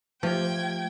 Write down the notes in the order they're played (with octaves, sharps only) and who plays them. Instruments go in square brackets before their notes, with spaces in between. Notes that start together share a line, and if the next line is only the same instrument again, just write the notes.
[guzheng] F3 [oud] A3 G4 [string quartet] G5 G#6